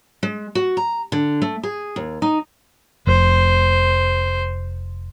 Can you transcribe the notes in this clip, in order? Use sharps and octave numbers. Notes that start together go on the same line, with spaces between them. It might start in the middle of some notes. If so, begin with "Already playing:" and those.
G#3
F#4
A#5
D3
A3
G#4
D#2
D#4
F1 C5